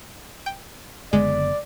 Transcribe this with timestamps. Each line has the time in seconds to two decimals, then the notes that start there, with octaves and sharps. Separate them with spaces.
0.46 G5
1.13 F#1 D3 G#3 B3 D5